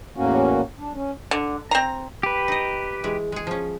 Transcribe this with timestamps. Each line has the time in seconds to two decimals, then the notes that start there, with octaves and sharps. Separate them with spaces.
0.17 E2 A2 A#3 C#4 F#4
0.79 D4
0.94 C#4
1.31 D3
1.71 C4 A#5
2.23 G4 B4
2.48 D#4 D#5
3.04 E3 G#3
3.32 G#3 G#4
3.47 F3 C#4